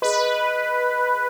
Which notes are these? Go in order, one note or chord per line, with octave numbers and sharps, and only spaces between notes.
G#4 B4 D#5